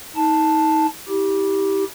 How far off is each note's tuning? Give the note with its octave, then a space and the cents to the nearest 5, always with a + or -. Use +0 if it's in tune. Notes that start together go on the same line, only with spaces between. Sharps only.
D#4 +30 A5 +0
E4 -35 G4 +0